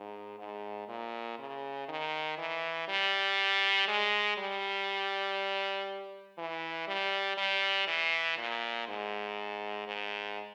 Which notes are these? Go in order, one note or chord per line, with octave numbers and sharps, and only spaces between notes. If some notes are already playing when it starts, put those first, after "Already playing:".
Already playing: G#2
G#2
A#2
C#3
D#3
E3
G3
G#3
G3
E3
G3
G3
E3
A#2
G#2
G#2